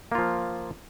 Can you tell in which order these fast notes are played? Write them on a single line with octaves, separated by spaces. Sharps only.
A#3 F4 F3